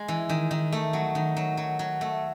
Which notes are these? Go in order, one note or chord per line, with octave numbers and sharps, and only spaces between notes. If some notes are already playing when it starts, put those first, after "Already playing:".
Already playing: G#3
E3
D#3
D#3
A3
F#3
D#3
F#3
F#3
F#3
A3